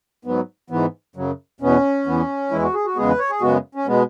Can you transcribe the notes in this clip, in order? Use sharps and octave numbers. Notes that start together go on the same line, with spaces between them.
G#2 F#3 B3
G#2 E3 B3
F#2 C#3 F#3
E2 B2 B3 C#4
E2 E3 B3
E2 E3 G#3 E4
F#4
G#4
F#4
E2 C#3 G#3 B3 G#4
B4
C#5
G#4
F#2 C#3 G#3 B3 F#4
C#4
B2 G#3 B3